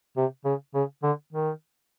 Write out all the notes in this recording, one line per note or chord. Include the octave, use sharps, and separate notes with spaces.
C3
C#3
C#3
D3
D#3